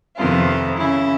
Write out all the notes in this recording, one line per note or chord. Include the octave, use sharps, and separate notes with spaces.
F2 C3 D#3 B3 E4 F4
C#3 E4